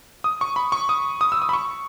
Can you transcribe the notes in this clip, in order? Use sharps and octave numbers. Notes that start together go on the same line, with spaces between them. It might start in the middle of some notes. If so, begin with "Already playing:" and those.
D#6
C#6
B5
C#6
D#6
D#6
E6
D#6
B5
C#6